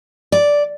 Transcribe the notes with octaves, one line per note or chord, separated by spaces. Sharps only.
D5